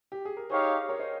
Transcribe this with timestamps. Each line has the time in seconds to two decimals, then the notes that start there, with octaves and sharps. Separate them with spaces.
0.12 G4
0.25 G#4
0.37 A#4
0.50 D#4 G4 G#4 C5 C#5 F5
0.89 A#4 C#5
0.99 C5 D#5